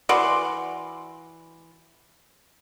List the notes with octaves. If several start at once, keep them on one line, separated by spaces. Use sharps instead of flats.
E3 F#4 D5 C6